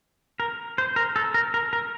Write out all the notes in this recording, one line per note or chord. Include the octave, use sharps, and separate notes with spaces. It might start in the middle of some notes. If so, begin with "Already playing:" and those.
A#4
C5
A#4
A4
A#4
A#4
A#4